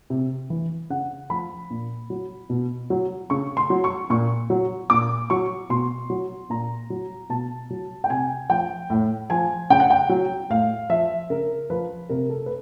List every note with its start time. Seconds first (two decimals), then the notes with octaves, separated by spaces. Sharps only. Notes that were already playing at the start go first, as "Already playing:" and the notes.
0.10 C3
0.50 E3
0.90 C#3 F#5
1.30 F3 B5
1.70 A#2
2.10 F#3
2.50 B2
2.90 F#3
3.30 C#3 C#6
3.57 C6
3.70 F#3
3.84 C#6
4.10 A#2 C#6
4.50 F#3
4.90 A#2 D6
5.30 F#3 C#6
5.70 B2 C6
6.10 F#3
6.50 A#2 A#5
6.90 F#3
7.29 B2 A5
7.70 F#3
8.04 G5
8.10 C3 G#5
8.49 F3 G5
8.90 A2
9.30 F3 G#5
9.70 C#3 G5
9.80 F#5
9.90 G5
10.09 F#3
10.50 A2 F5
10.89 F3 E5
11.30 C#3 A#4
11.70 F3 B4
12.09 C3 A#4
12.29 A4
12.46 B4